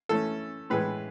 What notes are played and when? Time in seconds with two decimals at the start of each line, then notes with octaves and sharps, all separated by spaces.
0.09 E3 A3 C#4 A4
0.70 A2 E3 G#3 B4